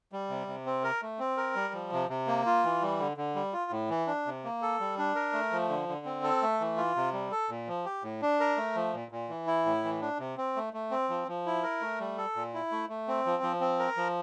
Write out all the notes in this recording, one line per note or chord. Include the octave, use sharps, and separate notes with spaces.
G3
C3
C3
C4
A#4
A3
C4
A#4
G3
F3
C3
C3
A#3
F4
E3
G3
D3
D3
G3
F4
A2
E3
D4
C3
A#3
A4
G3
D4
A#4
A3
F3
D3
D3
C4
A4
A3
E3
F4
C3
G3
A4
A#2
F3
G4
A2
D4
A#4
A3
F3
A#2
A#2
E3
E4
A2
E3
D4
C3
C4
A3
A3
C4
F3
F3
E4
A#4
A3
G3
A4
A#2
E4
A3
A3
C4
F3
F3
C4
A#4
F3